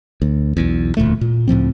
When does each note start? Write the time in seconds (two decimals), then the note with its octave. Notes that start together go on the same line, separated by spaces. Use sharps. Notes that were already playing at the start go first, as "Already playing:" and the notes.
0.22 D2
0.57 B1 E2
0.97 E1 D2 A#2 A3
1.21 A#2
1.48 C#2 A2 F3 C4